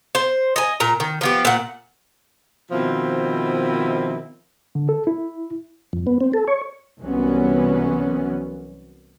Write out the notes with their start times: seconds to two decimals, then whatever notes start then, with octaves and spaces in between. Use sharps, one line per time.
0.15 C5
0.56 D#5 G#5
0.80 A#2 A#5
1.00 D#3
1.21 F3 B3 G4
1.45 A#2 F#5
2.71 B2 D#3 F3 C4 E4
4.75 D3
4.89 A4
5.07 E4
5.93 F2
6.07 B3
6.21 C4
6.33 A4
6.48 C#5
7.01 C2 E3 F#3 B3 C#4